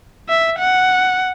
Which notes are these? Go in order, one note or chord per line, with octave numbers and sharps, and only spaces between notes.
E5
F#5